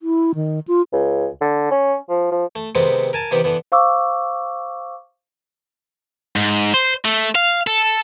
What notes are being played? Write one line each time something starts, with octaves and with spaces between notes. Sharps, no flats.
E4
D#3
F4
C#2
D3
C#4
F3
F3
A3
C3 D#3 G#3 B3 C4
A#4 G#5 A5
C3 D#3 E3 B3 G4
D3 E3 B3
C5 F5 C#6 D6 E6
G#2
C5
A3
F5
A4